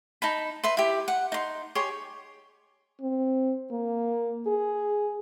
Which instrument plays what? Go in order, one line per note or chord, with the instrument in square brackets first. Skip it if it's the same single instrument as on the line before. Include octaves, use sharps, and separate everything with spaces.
[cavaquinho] D#4 A5 B5
B4 E5 C6
E4 G4
F#5
D#4 C6
G4 G#4 C#5 C6
[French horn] C4
A#3
G#4